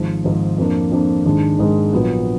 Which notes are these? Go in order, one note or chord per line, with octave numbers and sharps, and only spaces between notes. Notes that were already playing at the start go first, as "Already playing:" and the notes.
Already playing: G#1 G#2 F3
G#1 G#2 F3
F2 F3 A#3 D4
F2 F3 A#3 D4
G#1 G#2 D#3 G#3 D4
G#1 G#2 D#3 G#3 D4
A#1 A#2 F#3 B3